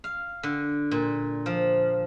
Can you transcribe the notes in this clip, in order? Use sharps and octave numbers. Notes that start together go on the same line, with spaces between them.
F5
D3
A#2
F3